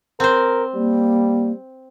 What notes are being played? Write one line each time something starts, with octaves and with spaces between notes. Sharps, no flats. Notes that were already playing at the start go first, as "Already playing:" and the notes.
C4 A#4 C5
G3 A#3